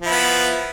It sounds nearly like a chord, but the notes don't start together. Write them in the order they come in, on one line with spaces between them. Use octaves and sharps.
F3 E4 B3